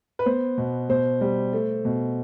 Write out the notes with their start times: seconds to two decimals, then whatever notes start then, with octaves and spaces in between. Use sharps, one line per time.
0.19 B4
0.26 B3 C5
0.58 B2
0.89 B2 C5
1.21 G3
1.53 A3
1.85 B2